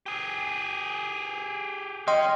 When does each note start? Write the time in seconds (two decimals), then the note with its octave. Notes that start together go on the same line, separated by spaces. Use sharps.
0.06 G4 G#4
2.08 C#4 D#5 G5 C6